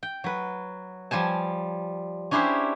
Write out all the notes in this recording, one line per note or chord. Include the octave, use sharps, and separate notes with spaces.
G5
F#3 B4
F3 G3 G#5 A5
C#4 D4 E4 G4 G#4 C5